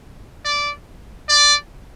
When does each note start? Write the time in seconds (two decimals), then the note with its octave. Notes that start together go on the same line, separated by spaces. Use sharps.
0.45 D5
1.29 D5